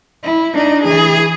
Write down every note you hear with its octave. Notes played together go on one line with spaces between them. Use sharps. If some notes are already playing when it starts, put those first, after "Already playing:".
E4
D4 D#4
E3 G#4